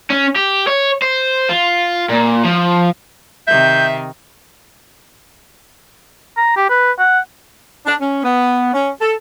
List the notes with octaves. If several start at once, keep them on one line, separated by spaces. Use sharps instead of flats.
C#4
G4
C#5
C5
F4
A#2
F3
C3 D#3 E5 G6
A#5
G4
B4
F#5
D4
C#4
B3
C#4
A4